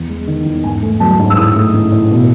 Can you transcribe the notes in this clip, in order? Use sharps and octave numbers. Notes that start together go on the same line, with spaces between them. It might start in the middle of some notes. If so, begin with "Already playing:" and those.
Already playing: E2
G#3
D#3
E2
G#2 G#5
A3
F#3 A5
G#2
E6
A2 D#6
A3
E3
A2
B2